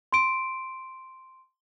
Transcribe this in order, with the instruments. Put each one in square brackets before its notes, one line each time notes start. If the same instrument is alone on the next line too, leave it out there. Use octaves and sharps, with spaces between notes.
[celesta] C6 D7